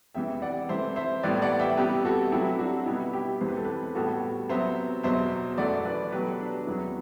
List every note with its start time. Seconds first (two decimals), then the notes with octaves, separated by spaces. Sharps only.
0.14 E2 C3 E3 E5 G5
0.42 D5 F#5
0.69 C3 E3 A3 C5 E5
0.96 C5 E5
1.23 A2 E3 G3 B3 B4 D5
1.42 D5 F#5
1.59 E5 G5
1.77 C3 G3 B3 G4 B4
2.05 F#4 A4
2.32 C3 F#3 A3 E4 G4
2.59 D4 F#4
2.86 B2 G3 B3 E4 G4
3.13 E4 G4
3.41 E2 C3 E3 B3 C5
3.48 B4
3.57 A4
3.65 G4 B4
3.95 A2 G3 B3 F#4 A4
4.49 C3 F#3 B3 C5 E5
5.03 E2 B2 F#3 C5 E5
5.58 F#2 E3 A3 D5 F#5
5.85 B4 D5
6.12 B2 F#3 A3 G4 B4
6.40 D4
6.67 E2 C3 F#3 B3 E4